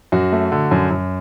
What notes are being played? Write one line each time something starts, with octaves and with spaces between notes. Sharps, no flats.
F#2 F#4
A3
D3
F#2
F#2